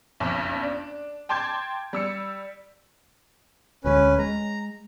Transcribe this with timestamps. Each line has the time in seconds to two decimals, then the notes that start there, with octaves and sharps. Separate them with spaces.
0.20 F#1 B1 F2
0.62 D4
1.29 G5 A5 C6 D6 G6 G#6
1.93 G3 E6 C#7
3.84 D1 D2 G#3 C#4 B4
4.19 G#3 A#5